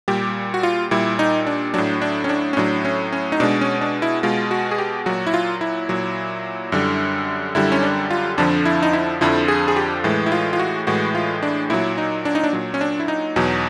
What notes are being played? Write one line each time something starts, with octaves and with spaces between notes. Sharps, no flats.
A#2 G3 G4
F#4
F4
A#2 G3 E4
D#4
D4
A2 F#3 D4
D4
C#4
D4
C#4
A2 F#3 D4
C#4
C#4
D#4
B2 G#3 D4
C#4
D4
E4
B2 G#3 F4
F#4
G#4
G4
A#2 F#3 F#4
E4
F4
E4
A#2 F#3
F#2 D3 G3
F#2 D3 G3 E4
C#4
D4
F4
F2 D3 F3 D4
E4
D#4
E4
F2 D3 F3 E4
G#4
G#4
G4
A2 E3 G#3
E4
F4
F4
F#4
A2 E3 G#3 F#4
F4
D4
A#2 F#3 E4
D#4
D4
D#4
D4
A#2 F#3
C#4
D4
E4
D#4
E2 B2 F#3